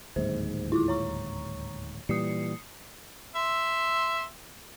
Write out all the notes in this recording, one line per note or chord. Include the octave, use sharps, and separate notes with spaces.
D1 D#2 G#2 C5
E4 F4 D6
C#5 A#5 C#6
A#2 E3 G3 D#6 C7 C#7
E5 C6